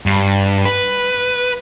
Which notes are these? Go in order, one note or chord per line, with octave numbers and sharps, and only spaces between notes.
G2
B4